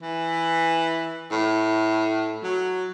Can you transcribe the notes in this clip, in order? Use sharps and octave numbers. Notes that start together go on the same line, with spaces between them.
E3
A2
F#3